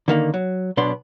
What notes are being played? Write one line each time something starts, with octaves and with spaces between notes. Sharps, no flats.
D3 D#3 A#3
F#3
B1 B2 B3 D4 C6